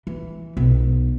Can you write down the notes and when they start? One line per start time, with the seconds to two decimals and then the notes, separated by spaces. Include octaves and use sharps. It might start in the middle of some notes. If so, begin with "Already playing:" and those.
0.07 E3
0.57 B1